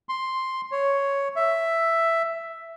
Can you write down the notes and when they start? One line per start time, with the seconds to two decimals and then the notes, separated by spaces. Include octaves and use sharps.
0.09 C6
0.72 C#5
1.36 E5